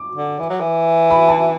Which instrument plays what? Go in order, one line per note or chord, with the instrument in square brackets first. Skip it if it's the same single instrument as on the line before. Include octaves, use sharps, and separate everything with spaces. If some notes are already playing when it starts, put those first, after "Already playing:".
Already playing: [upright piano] D6
[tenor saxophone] D3
E3
F#3
E3
[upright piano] B5
A5